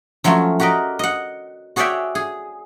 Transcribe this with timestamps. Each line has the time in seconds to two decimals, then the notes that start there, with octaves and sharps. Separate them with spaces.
0.24 F3 F#3 A3 C#4 F4
0.60 F#4 G4 A#4 D5 D#5
0.99 D#5 F#5
1.76 F#4 G#4 C#5 D5 E5 G5
2.15 G#4